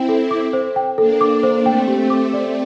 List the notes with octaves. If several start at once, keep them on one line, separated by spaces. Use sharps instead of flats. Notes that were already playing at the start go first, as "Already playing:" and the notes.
Already playing: C4 E4 C5 G5
A4
D6
C5
G5
A#3 D4 A4
D6
C5
A3 C4 G5
G4
A3
D6
A3 D5